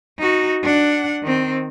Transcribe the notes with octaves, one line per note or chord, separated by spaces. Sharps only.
D#4 F#4
D4 F#5
D#3 C4